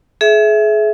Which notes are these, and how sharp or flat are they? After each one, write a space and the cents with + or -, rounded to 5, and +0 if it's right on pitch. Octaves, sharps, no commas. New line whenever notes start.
G#4 +35 E5 +0